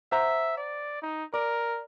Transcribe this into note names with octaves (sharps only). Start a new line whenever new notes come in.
C5 E5 F#5 A#5
D5
D#4
A#4 D5